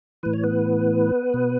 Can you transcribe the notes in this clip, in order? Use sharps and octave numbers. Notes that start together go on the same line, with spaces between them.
A2 E3 B4
C#5
B3 B4
B2